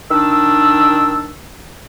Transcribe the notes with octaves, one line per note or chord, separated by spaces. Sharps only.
D#3 D4 E6